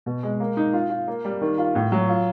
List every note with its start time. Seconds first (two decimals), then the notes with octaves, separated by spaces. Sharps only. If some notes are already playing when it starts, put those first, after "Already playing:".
0.06 B2
0.23 G#3
0.40 A#3
0.57 D#4
0.73 F4
0.90 F4
1.08 A#3
1.25 G3
1.41 D#3
1.58 F4
1.75 A2
1.92 F#3
2.08 F4